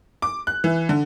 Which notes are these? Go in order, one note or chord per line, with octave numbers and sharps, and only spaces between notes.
D6
F#6
E3
D3